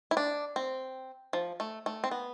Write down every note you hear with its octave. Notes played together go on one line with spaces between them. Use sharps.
E4
D4
C4
F3
A3
A3
C4
B3